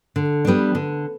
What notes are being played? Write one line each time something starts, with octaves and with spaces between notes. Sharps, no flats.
D3
G3 B3 D4
D3